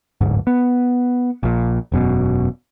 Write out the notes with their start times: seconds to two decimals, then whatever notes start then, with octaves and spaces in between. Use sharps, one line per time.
0.21 D1 G1 G#2
0.47 B3
1.43 A#1 A#2
1.92 E1 F#2 B2